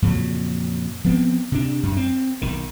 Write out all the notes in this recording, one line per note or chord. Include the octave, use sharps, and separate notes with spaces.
F2 A#2 C#3 F#3
F3 B3 C4
C3 D4
F#2
C4
B1 D#3